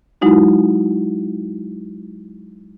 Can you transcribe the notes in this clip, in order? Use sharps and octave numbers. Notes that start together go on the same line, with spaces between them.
F#3 G#3 D#4 E4 F#4